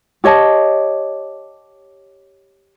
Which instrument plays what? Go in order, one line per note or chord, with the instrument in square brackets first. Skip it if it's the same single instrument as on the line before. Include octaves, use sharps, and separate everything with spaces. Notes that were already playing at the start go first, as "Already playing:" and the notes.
[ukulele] G4 C#5 D#5 A5